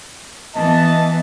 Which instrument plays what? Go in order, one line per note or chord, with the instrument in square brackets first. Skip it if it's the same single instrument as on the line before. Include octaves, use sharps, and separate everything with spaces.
[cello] E3 B3 [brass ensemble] D#5 A5